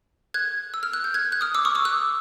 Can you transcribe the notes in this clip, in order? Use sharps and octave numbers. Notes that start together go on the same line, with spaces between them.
F#6 G#6
E6
F6
F#6
G6
F#6 G#6
F#6
D#6 F6
D6 E6
C#6 D#6
D6 E6
E6 F#6